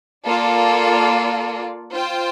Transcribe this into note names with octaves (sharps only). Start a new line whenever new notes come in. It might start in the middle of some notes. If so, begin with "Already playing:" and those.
A#3 F4 A4 D5
F4 C5 G5